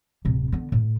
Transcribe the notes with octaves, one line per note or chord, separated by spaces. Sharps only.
D1 C3
D3 B3
A2